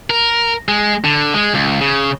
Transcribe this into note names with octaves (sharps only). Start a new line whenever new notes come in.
A#4
G#3
D3
G#3
C#2
C#3